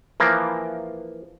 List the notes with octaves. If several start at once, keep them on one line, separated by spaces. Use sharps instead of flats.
E3 F3 A#3